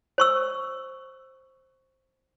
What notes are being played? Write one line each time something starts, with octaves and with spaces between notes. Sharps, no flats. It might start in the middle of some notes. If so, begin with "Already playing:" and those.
C5 C#6 E6